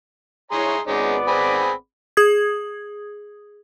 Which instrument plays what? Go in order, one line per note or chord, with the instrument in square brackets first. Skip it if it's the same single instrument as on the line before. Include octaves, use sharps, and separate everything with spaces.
[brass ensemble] E4 C#5 [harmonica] G#4 A#5 C6
[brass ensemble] G#1 B3 D5 [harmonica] G#3 C#4 D#4
[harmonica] C4 G#4 B5
[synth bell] G#4 D#6 G#6